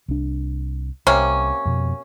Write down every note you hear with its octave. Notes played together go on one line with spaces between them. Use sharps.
C2 D4
C2 C3 A#3 C#4
F2 B2